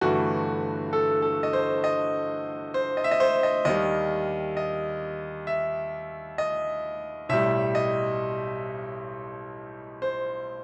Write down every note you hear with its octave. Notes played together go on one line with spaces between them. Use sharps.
G1 G2 E3 A3 F#4
A4
A4
D#5
C5
D#5
C5
D#5
E5
D#5
C5
D#5
D#2 D#3 G3 D#5
D#5
E5
D#5
B1 A2 G3 E5
D#5
C5